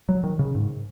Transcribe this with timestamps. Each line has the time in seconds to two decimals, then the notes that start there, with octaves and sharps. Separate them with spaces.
0.09 F#3
0.24 D#3
0.39 C#3
0.55 G#2